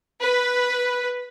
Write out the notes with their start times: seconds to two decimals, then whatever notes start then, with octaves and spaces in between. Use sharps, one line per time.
0.20 B4